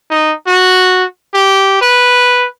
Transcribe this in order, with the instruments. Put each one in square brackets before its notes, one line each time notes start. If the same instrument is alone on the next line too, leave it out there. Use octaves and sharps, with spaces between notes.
[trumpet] D#4
F#4
G4
B4